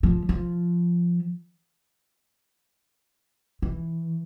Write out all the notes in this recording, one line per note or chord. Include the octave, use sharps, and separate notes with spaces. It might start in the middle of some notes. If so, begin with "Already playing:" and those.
F3
F3
E3